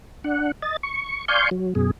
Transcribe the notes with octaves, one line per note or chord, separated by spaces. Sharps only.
D4 F#5
D#5 A6
C#6
D5 F5 G#5 C6 C#6 G6
F#3
F#2 B2 G#4